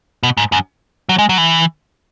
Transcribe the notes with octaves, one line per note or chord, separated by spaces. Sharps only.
B2
G#2
F#2
F#3
G#3
F#3
E3